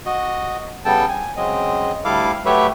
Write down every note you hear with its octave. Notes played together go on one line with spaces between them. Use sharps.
F#4 D#5
C#3 G3 B3 A4 G5 A5
G#5
C#3 F#3 G#3 C4 D#5
D2 G3 E4 A4 F5 D6
F#3 A3 G4 B4 C#5 E5